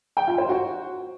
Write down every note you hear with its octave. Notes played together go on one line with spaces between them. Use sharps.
G5
F4
C5
F#4